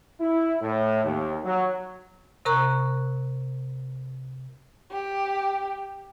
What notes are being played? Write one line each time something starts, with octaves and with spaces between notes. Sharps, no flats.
E4
A2
D#2
F#3
C3 A#4 A#5 C#6 F#6
G4